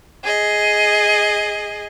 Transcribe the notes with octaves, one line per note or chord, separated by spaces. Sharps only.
G#4 D#5